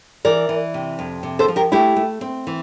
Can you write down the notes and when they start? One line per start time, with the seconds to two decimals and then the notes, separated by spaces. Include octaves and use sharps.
0.25 E3 A#4 D5
0.49 E3
0.74 C3
0.99 F2
1.23 C3
1.39 A4 C5
1.48 F3
1.56 G4 A#4
1.72 A3 E4 G4
1.96 A3
2.21 C4
2.47 E3